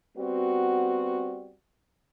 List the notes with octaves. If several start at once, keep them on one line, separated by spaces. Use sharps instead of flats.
G3 B3 C4 F#4